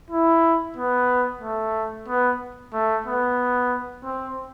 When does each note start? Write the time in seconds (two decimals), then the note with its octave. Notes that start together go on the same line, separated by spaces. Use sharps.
0.10 E4
0.76 B3
1.41 A3
2.08 B3
2.73 A3
3.06 B3
4.04 C4